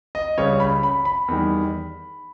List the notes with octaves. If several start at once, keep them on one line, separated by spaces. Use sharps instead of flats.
D#5
C#2 C#3 G3 C#5
B5
B5
B5
E2 D#3 G3